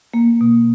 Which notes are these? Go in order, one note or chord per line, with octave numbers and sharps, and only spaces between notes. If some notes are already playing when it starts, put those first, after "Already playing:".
A#3
B2